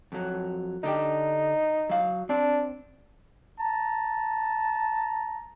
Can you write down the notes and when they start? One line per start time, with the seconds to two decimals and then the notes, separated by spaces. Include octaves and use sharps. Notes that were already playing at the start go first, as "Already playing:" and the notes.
0.12 F2 F#3
0.83 D3 D4 D#4 G4
1.89 F#3 F5
2.29 C4 D4
3.59 A5 A#5